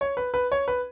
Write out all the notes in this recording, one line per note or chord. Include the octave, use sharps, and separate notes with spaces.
C#5
B4
B4
C#5
B4